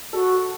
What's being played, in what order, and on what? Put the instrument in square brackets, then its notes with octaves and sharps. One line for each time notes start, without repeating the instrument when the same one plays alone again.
[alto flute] F#4 [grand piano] A4